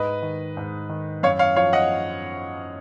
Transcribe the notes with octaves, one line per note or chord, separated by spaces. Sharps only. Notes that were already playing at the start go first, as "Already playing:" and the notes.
Already playing: G#2 B4 D#5
D#3
G#2
D#3
F#2 C#5 F5
C#5 F5
F3 C#5 F5
D#5 F#5